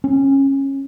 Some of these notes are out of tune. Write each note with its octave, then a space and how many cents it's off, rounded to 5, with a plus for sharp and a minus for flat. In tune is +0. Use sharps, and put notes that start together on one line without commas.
C#4 -20